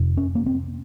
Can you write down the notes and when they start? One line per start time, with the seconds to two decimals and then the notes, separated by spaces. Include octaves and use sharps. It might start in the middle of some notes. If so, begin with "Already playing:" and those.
Already playing: F2 C3
0.17 C#4
0.35 A#3
0.46 C4